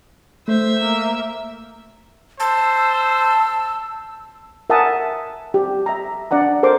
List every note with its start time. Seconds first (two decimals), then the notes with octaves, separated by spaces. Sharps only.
0.48 A3 C5 E5
0.81 A#3
2.40 C5 A5 E6
4.70 A#4 E5 F#5 G#5 A5 D#6
5.54 G4
5.86 E5 A#5
6.31 D4 D5 F#5 A#5
6.63 A4 A#4 C5 C6 D6